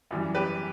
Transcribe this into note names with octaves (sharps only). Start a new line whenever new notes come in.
F#2 E3 G3
G4 B4